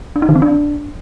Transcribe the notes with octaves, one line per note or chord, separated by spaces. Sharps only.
D4
D#4
D#3
C4
D4